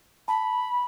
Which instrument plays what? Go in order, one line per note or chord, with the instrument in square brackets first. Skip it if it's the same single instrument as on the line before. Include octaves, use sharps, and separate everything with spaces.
[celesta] A5 [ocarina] B5